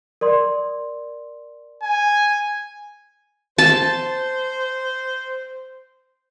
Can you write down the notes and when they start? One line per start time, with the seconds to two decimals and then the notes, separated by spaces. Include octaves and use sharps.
0.21 A#4 D5 C6
1.83 G#5
3.58 C5 A5